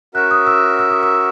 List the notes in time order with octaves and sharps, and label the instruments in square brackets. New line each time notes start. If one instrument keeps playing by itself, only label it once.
[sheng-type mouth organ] C#4 F#4 A#4 E5 [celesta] F#6
[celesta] D#6
E6
E6
D#6
E6